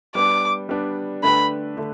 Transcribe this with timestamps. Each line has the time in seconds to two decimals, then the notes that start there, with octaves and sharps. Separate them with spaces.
0.15 G3 B3 D4 D6
0.69 G3 B3 D4
1.23 D3 A3 D4 G4 B4 B5
1.77 D3 A3